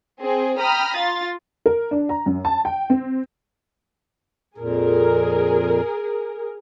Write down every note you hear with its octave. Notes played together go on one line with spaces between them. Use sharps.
C4 G#4
G5 A#5 B5 D#6 F6
F4 A6
A#4
D4
A#5
F#2
A5
G5
C4
F2 A#2 G#4 A#4